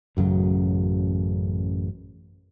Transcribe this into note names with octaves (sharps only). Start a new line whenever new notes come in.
A1 F#2 C#3 F#3